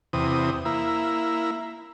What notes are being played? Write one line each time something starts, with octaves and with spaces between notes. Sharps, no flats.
E2 C3 D#6
A#3 E4